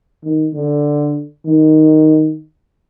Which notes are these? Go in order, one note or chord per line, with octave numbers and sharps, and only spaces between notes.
D#3
D3
D#3